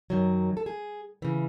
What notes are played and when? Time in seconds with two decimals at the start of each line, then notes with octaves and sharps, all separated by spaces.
0.10 F#2 D#3 F#3
0.57 A4
0.66 G#4
1.22 C#3 E3